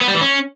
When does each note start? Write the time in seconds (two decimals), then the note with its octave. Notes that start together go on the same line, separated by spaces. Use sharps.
0.01 B3
0.08 G3
0.15 E3
0.21 C#4